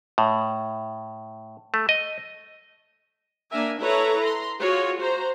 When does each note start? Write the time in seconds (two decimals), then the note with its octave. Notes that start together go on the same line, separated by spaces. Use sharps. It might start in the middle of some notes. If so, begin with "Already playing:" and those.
0.18 A2
1.74 A3
1.89 D#5
3.51 A#3 D4 A#4 E5 G#5
3.81 E4 A4 B4 C#5 A#5
4.21 A#5 C6
4.61 F4 F#4 G#4 C#5
4.99 F#4 C5 A#5